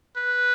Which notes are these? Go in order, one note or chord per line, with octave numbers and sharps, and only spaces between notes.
B4